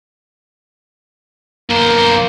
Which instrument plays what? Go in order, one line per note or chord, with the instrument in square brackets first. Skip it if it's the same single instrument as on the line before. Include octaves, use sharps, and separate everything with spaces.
[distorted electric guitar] B1 C5 [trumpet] A#3